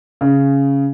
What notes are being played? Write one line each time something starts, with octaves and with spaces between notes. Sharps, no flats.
C#3